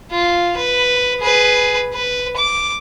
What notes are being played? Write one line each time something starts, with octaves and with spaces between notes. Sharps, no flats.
F4
B4
G#4 B4
B4
D6